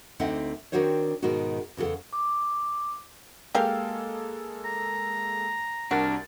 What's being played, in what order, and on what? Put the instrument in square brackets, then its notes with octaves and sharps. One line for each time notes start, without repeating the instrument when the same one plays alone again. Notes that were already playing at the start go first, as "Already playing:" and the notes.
[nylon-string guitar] D2 D3 C4 D#4 E5 F#5
D#3 C4 D4 F#4 C5 C#5
G#2 B2 D#3 G#3 D#4 F#4
E2 C#3 F#4 A4 F#5
[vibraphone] D6
[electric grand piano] G#3 A#3 A4 [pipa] G4 A#4 F5
[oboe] A#5
[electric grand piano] C2 A#4 A6 [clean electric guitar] D4 [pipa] F#4